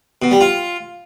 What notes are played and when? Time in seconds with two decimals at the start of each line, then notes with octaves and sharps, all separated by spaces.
0.22 B2
0.31 G3
0.41 F4